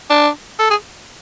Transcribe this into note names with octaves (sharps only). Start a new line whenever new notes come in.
D4
A4
G#4